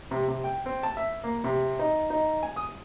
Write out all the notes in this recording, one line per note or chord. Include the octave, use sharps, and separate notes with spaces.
C3
C3
G5
C4
A5
E5
A#3
C3
D#4
D#4
G#5
D#6